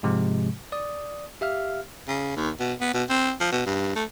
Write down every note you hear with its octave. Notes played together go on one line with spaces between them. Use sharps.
G#2 C3 F3 G#3
D5 D#6
G4 E5 F5 F6
C#3
D#2
B2
B3
B2
C4
F3
B2
G2
A3